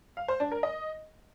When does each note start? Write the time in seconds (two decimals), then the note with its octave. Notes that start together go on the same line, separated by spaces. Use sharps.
0.17 F5
0.28 C5
0.40 D4
0.52 A#4
0.63 D#5